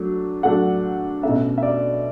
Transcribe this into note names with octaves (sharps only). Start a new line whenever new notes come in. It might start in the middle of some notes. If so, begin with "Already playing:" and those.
Already playing: F#3 A3 D4
F#3 A3 D4 F#5
B2 A3 C#4 E5
E5
D5